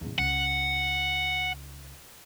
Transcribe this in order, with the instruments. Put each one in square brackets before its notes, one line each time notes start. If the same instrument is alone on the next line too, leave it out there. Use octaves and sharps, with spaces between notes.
[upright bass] A1 E2
[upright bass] C#2 [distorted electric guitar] F#5